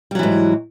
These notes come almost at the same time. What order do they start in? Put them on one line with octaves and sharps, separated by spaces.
G3 F#3 E3 G#2